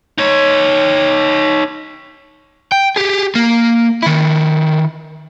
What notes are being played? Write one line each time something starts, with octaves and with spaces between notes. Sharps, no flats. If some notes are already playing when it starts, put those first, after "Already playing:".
D#4 C#5
G5
G4 G#4
A#3
D#3 E4